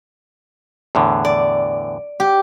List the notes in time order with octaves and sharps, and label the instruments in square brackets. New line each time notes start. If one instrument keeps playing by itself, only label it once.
[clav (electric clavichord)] E2 A2 D3
[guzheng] D5
G4